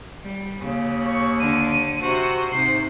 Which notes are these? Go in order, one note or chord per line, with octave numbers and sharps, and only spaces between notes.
G3
D#2 C#3
C#6
D3 D#7
C3 F#4 C5
G#2 C3 C7